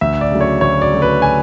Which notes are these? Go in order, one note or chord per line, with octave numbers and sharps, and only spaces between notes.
D2 E5
D5
C#3 F#3 A3
C#5
D2 C#5
D5
C#3 F#3 A3
B4
G#5